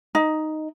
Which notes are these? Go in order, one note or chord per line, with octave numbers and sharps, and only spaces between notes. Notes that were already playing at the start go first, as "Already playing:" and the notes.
D#4